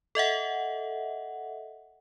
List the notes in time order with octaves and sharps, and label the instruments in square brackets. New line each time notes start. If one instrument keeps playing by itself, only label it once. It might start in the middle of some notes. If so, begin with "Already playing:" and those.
[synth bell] A4 D#5 E5 F#5